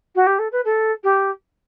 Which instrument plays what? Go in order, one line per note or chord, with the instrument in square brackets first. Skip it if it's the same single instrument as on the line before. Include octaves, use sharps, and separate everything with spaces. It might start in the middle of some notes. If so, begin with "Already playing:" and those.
[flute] F#4
G4
A4
B4
A4
G4